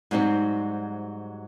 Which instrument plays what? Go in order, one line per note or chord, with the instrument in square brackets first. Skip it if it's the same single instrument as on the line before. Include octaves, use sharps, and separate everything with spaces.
[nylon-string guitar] G#2 F#3 G3 C4 F#4